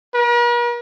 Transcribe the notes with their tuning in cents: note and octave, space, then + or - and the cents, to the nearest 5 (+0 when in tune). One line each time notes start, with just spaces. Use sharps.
A#4 +45